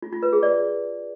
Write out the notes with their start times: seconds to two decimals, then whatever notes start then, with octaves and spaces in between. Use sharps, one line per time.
0.02 F4
0.13 F4
0.23 B4
0.33 G#4
0.43 D5